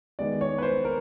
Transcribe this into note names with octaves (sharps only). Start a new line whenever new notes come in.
D#3 G#3 B3 D5
C#5
B4
C5
A#4